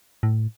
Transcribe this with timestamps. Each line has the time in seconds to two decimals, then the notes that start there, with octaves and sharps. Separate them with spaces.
0.23 A2